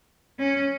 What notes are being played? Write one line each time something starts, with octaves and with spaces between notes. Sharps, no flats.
C#4